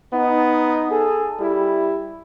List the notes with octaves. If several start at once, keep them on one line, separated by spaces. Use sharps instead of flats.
B3 D#4
G#4 A4
G3 E4